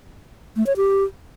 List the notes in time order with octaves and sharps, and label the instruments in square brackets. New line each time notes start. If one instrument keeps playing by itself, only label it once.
[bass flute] A3
C#5
G4